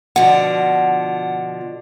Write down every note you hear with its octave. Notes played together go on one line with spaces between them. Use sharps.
B2 D3 F3 F#5